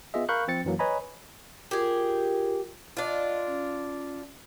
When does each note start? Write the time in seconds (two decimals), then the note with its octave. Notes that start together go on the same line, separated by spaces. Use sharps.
0.14 B3 F4 G#4 D#5 E5
0.29 A#4 F5 B5 C#6 F#6 G6
0.48 F3 C4 A6 C#7
0.65 F#2 E3 F#3 A#3
0.79 B4 C#5 D#5 G#5 A#5 B5
1.71 F4 G4 G#4 A#4
2.97 D4 F4 D#5
3.47 C#4